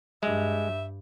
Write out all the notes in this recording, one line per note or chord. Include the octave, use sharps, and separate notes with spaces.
G2 G#3 E5